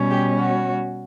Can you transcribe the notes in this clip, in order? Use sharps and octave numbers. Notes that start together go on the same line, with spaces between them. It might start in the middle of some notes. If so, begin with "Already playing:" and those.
Already playing: B2 G3 C#4
G4
F#4